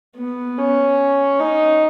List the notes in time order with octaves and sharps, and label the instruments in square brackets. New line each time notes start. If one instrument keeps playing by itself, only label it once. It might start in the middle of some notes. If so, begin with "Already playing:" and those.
[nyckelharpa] B3
C#4
D#4